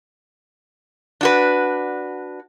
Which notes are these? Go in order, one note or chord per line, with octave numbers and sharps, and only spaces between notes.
D4 F#4 B4